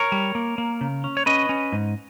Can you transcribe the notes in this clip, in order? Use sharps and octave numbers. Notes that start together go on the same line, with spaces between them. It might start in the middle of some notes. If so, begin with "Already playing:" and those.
Already playing: A#4 C#5
G3
A#3
A#3
C#3
C#4
C#5
C#4 B4 D#5
C#4
G#2